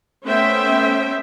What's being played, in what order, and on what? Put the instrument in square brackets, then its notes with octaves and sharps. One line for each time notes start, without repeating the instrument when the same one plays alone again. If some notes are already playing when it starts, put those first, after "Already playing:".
[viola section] A3 B3 C#4 C5 E5 G5